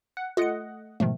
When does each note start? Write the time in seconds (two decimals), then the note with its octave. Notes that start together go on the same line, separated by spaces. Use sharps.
0.17 F#5
0.37 A3 F4 D#5 F#5 C#7
1.00 G#2 B2 D#3 F3 A3